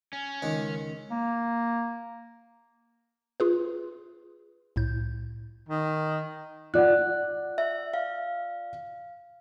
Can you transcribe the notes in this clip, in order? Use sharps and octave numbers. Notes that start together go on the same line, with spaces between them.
C#4
C#2 D#3
A#3
F4 G#4 B4
C2 A2 G6
D#3
F4 D5 F#5 F#6
E5
F5